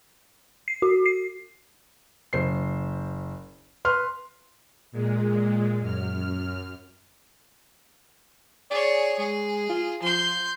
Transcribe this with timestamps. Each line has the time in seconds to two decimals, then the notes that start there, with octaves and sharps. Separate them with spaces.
0.68 C7
0.82 F#4
1.06 C7
2.33 F#1 C5 C7
3.85 B4 C6 F6
4.92 A#2 G#3
5.80 F#2 F6
8.71 G#4 C#5 D5
9.18 G#3 G#4
9.69 F4
10.02 F3 C6 G6